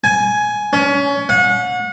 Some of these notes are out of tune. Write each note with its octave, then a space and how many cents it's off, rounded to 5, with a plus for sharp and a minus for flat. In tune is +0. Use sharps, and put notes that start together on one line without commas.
G#5 +10
C#4 +25
F#5 -35